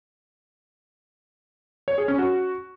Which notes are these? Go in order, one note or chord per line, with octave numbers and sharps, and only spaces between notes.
C#5
G#4
C#4
F#4